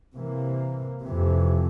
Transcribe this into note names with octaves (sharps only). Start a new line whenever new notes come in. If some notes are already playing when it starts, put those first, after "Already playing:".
C3 E3 A#3
F2 C3 E3